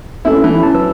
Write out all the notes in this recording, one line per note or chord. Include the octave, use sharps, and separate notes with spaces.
B3 C#4 E4 A4
E3 B5
C#4 A5
F#3 B4 E6